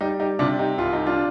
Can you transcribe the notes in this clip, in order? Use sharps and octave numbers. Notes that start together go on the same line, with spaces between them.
G3 D#4 G4
D#4 G4
C3 D4 F4
D#4 G4
C2 F4
D#4
D4 F4